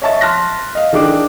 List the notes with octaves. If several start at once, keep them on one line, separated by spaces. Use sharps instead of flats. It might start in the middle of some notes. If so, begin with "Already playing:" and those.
C#5 D#5 E5 A5 C#6 A6
A5 C6 F6 F#6 A#6 B6
D#5 F5
D#3 E3 D4 G#4 D6